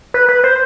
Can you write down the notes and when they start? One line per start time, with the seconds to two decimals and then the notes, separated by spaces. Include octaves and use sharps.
0.14 B4
0.29 B4
0.44 C5